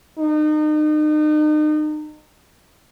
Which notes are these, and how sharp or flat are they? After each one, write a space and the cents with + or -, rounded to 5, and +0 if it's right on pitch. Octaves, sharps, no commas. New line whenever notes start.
D#4 -35